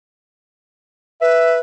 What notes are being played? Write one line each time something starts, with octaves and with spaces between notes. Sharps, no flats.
B4 E5